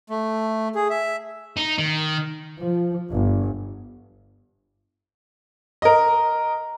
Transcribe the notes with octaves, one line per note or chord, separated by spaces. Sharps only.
A3
G#4
E5
D#4
D#3
F3
G1
A#4 D#5